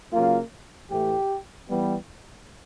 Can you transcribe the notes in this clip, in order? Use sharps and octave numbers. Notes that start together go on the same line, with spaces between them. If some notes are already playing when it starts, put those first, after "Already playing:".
C#3 F#3 A#3 F4
A2 E3 A3 G4
E3 G3 B3